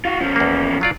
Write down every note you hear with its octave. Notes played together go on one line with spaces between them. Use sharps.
F4 F#4
F3 C#4
E2 A#3
F#3 F4 D5